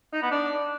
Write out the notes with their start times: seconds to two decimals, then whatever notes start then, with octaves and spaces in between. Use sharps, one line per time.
0.13 D#4
0.22 B3
0.31 D4